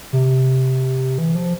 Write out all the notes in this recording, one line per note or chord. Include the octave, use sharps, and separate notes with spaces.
C3
E3
F3